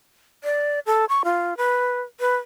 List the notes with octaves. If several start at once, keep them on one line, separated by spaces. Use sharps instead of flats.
D5
A4
C#6
F4
B4
B4